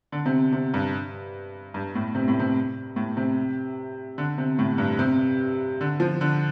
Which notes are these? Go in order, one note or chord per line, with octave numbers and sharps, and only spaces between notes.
D3
C3
C3
G2
G2
A2
C3
A2
C3
A2
C3
D3
C3
A2
G2
C3
D3
F3
D3